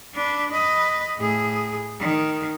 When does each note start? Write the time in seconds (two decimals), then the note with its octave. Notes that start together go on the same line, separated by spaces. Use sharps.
0.14 D4 B4
0.52 B4 D#5
1.18 A2 G#4
1.99 D#3